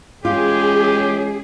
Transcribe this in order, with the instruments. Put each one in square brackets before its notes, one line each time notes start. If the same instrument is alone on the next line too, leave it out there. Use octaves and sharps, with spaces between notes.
[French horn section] E3 G#3 C#4 [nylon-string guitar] F4 [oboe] G4 [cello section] G#4